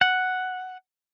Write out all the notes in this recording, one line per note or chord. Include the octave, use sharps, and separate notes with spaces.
F#5